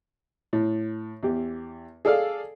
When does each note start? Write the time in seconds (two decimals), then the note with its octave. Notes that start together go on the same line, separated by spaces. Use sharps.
0.53 A2
1.23 E2 G4
2.05 G#4 A4 D5 F5